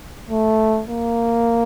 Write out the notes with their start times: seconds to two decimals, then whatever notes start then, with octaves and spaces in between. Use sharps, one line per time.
0.29 A3
0.89 A#3